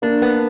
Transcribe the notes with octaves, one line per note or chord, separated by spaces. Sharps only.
A#3 D4
B3